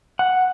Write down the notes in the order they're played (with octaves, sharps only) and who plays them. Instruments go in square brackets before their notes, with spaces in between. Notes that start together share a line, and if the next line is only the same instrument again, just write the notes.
[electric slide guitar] F#5